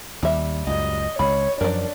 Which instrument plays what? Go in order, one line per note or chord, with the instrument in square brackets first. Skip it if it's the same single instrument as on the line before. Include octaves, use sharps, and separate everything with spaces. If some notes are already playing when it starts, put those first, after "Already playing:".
[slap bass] D#2 [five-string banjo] G3 E5
[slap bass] C#2 F#2 [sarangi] D#5
[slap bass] C#2 [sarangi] C#5 [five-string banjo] B5
[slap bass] F#2 F3 [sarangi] D4 [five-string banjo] A#4 D5